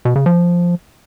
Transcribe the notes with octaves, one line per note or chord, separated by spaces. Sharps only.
B2
C#3
F3